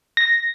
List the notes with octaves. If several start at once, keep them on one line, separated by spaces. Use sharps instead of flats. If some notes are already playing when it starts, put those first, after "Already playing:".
A#6